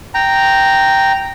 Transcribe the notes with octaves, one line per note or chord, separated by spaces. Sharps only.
G5 A#5